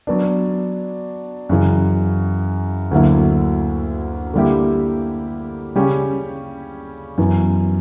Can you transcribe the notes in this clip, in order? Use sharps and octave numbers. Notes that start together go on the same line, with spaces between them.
F#3 B3 D4
F#2 C#3 E3
D2 D3 F#3 A#3 E4
D3 G3 A#3 E4 G4
C#3 G3 C#4 G4
F#2 E3 B3